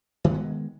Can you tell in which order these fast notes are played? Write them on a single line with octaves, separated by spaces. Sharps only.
D#3 A#3 B3 G#3